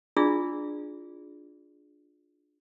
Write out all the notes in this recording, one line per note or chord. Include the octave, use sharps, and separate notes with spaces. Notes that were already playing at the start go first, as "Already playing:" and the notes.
D4 E4 F4 G#4 D5 E6